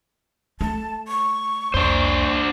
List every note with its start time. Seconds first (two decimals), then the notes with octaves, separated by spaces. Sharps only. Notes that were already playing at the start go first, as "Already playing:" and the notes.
0.61 A3 A5
1.08 C#6
1.74 C2 F2 D4 C5